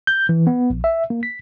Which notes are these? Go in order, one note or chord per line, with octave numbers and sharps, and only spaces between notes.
G6
E3
B3
A#1
E5
A#3
B6